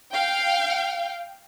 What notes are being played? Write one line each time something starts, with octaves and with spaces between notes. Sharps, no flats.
F5 G5